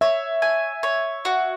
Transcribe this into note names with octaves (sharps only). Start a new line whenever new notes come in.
C#5 E5
G#5
C#5
F#4